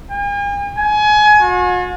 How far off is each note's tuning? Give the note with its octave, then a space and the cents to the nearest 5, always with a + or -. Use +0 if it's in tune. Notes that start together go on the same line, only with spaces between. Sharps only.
G#5 -45
G#5 +25
F#4 -45